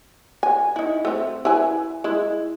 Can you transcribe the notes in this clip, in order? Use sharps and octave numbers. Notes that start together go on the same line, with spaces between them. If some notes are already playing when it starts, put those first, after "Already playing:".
G#5
D#4 E4
A3 C4
E4 B4 G#5
G#3 E4